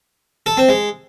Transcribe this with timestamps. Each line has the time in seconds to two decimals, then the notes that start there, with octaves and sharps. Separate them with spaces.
0.46 A4
0.57 C4
0.68 G#3